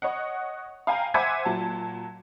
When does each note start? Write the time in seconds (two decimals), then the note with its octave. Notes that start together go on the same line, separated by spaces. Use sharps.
0.02 C#5 D#5 F#5
0.87 F5 G5 G#5 A#5
1.14 C5 E5 F#5 G#5 D6 G#6
1.45 A#2 F#3 A5